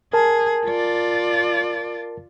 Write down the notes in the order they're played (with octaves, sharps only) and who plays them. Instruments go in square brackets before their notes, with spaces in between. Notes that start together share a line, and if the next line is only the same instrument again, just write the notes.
[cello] G#4 [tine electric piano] A#4 A5
[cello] F4 D5